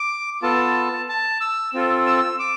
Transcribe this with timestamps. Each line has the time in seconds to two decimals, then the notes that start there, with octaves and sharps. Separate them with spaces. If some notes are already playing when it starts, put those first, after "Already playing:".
Already playing: D6
0.42 B3 F4 A4 A5
1.08 A5
1.41 E6
1.74 C4 F4 A4
2.06 E6
2.39 D6